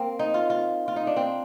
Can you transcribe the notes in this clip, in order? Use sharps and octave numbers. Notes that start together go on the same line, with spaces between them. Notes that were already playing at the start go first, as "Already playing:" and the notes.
Already playing: A#3 C4
D#4
F4
F4
F4
D#4
D4
C4